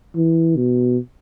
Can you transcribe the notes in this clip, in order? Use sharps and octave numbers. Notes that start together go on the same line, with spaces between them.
E3
B2